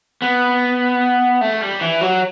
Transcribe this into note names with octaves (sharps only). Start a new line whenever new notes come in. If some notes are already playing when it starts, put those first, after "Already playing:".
B3
A3
G3
E3
F#3